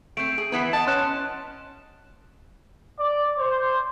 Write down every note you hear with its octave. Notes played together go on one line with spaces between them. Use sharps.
A3 C4 D7
G#4
E3 B3 E4 B4
B3 D#5 A5
C#4 C6 F#6 E7
D5
C5